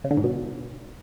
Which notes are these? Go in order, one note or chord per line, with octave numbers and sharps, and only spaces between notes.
C#3
D3
G#2
B2